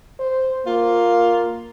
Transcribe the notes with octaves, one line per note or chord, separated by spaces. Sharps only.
C5
A#3 F4